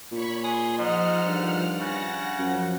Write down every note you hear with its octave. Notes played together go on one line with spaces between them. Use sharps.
A#2 C#5 B5 C#6
G#4 C6
G#2 F3 D#5 F#5 F6
G2 D#3 F4 D5
C#3 F#5 A#6
F#2 F3 F#5